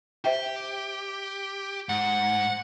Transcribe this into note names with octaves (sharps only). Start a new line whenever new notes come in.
G4 C5 E5 G5
G#2 F#5